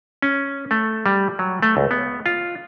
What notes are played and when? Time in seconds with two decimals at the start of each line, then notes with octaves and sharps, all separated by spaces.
0.22 C#4
0.71 A3
1.06 G3
1.39 F#3
1.62 A3
1.77 C#2
1.91 B3
2.26 F4